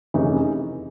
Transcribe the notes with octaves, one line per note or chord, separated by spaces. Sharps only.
F1 F2 C#3 E3 C#4 D#4